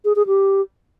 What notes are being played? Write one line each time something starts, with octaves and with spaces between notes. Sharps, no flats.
G#4
G#4
G4